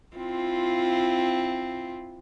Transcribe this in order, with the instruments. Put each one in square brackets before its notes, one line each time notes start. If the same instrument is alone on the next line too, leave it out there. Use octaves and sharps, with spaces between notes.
[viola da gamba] C4 E4 F4